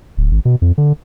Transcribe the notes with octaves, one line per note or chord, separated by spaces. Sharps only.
D1
G#1
B2
F2
D3